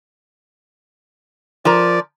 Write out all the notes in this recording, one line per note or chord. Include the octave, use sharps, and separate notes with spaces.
F3 A#4 D5